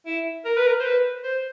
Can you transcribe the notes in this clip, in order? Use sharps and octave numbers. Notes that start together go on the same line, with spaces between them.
E4
A#4
B4
A#4
C5
B4
C5